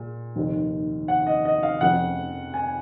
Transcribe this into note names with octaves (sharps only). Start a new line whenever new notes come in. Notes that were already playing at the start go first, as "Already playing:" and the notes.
Already playing: A#2 G#3
F1 D#2 D#3
F#5
D#5
D#5
F5
F1 F2 C#3 F#5
G#5